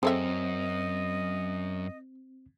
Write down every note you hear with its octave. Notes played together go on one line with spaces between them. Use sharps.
F#2 C4 G#4 A4 D#5 E5